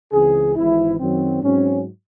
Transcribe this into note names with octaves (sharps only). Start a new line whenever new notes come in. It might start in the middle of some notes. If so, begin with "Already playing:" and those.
C#2 C#3 E3 C4 G#4
G#1 G#2 E3 C4 E4
F#2 D#3 F#3 C4
G#2 F#3 C4 C#4